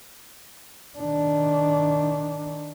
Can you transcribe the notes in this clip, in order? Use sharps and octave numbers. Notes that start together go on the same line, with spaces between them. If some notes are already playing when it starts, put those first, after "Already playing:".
D#3 D4